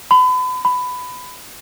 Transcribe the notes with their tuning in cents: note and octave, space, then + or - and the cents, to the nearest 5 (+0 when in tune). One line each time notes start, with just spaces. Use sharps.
B5 +35
B5 +15